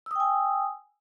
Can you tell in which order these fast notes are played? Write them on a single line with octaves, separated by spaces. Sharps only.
E6 D#6 G5 G#5